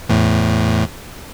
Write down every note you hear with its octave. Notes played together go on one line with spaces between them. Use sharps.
E2 A2